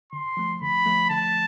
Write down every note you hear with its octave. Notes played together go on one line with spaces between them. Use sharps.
D3 C6
F3 A3
D3 B5
F3 A3
D3 A5